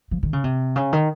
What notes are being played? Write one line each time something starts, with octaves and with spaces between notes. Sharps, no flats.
F3
D#3
C#3
C3
C#3
D#3